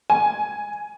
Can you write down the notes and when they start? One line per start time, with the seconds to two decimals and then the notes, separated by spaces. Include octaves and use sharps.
0.10 G#5